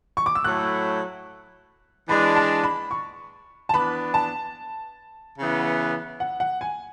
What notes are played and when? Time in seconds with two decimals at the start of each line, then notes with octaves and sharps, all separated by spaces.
0.17 C#6
0.26 D6
0.35 E6
0.44 A2 F#3 A3 E4 F#6
2.08 E3 G#3 D4 B5
2.36 A5
2.63 B5
2.91 C#6
3.69 A5
3.74 E3 B3 D4 B5
4.14 A5
5.38 C#3 E3 B3
6.20 F#5
6.40 F#5
6.61 G#5